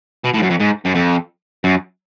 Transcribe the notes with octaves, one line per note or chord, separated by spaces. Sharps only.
B2
A2
G#2
F#2
F2
G#2
F#2
F2
F#2